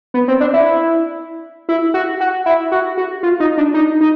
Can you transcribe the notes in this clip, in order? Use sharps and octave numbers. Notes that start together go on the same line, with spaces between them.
B3
C4
D4
E4
E4
F#4
F#4
E4
F#4
F#4
F4
D#4
D4
D#4
D#4